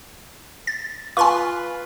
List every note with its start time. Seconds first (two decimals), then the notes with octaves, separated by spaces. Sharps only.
0.67 A6
1.17 F4 B4 G#5 C6 C#6